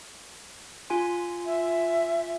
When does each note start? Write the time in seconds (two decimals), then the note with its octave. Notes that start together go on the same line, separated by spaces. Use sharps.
0.90 F4 G#5 C6
1.45 E5